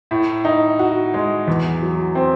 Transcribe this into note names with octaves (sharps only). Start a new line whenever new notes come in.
A2
D#4
F#4
G#3
E2
F#3
C4